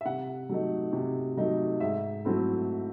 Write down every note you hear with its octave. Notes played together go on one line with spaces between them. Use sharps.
E5
C3 F#5
F#3 A3 D#4
C3
F#3 A3 D#4
G#2 E5
F#3 A3 C4 E4